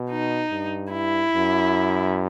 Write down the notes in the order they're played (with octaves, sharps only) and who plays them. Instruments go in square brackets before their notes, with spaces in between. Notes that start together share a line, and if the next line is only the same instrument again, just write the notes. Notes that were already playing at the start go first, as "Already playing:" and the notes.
Already playing: [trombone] B2
[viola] D#4
[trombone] G2
[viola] E4
[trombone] F#2